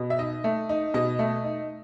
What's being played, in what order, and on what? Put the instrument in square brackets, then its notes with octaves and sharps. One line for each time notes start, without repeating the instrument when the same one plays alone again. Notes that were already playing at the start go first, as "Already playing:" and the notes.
Already playing: [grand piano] B2
E5
D#4 D#5
A3
D#4
B2 D#5
A3
D#4